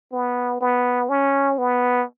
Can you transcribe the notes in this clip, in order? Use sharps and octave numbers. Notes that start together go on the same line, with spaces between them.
B3
B3
C#4
B3